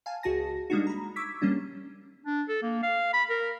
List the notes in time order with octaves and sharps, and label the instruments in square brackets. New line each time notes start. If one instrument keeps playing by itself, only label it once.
[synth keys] F5 G#5 A5
C#2 F#4 G#4 A5 A#6
G3 G#3 A#3 D4 D#4 F#4
A#5 B5
C#6 D6 E6 G#6 B6
G3 A#3 C#4 D4
[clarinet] D4
A4
A#3
F5
B5
A#4